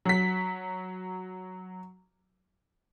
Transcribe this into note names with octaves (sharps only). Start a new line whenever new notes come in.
F#3 B6